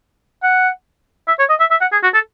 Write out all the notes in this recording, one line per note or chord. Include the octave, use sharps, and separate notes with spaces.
F#5
E5
C#5
D#5
E5
E5
F#5
G#4
F#4
A4